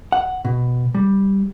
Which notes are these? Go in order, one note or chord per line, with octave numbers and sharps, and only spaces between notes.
F#5
B2
G3